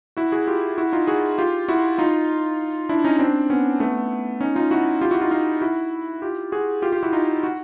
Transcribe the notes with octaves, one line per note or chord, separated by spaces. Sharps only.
E4 F#4
F#4 G#4
F4 G4
E4 F#4
D#4 F4
F#4 G#4
F4 G4
E4 F#4
D#4 F4
D4 E4
C#4 D#4
C4 D4
B3 C#4
A3 B3
C#4 D#4
D#4 F4
E4 F#4
F4 G4
E4 F#4
D#4 F4
D#4 F4
E4 F#4
F4 G4
F#4 G#4
F4 G4
F4 G4
E4 F#4
D#4 F4
F#4